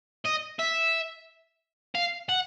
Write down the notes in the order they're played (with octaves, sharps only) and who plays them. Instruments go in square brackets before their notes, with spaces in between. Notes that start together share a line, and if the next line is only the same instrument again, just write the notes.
[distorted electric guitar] D#5
E5
F5
F#5